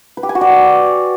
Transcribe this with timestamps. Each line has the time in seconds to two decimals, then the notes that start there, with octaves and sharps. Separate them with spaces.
0.17 B4
0.23 G4
0.29 G#5
0.35 F#4
0.41 D5